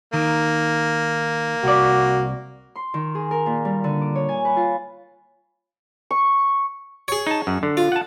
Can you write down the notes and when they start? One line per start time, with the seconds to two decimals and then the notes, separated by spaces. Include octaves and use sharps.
0.14 D#3 A#3
1.64 C2 F#4 D5
2.76 C6
2.94 D#3
3.15 G#4
3.31 A#4
3.46 A#2
3.65 G3
3.84 D3
4.02 D6
4.15 C#5
4.29 G#5
4.45 B4
4.57 F4
6.11 C#6
7.08 G#4 C#5
7.27 D#4 A5
7.47 F#2
7.63 D3
7.77 F4
7.92 F#5 A5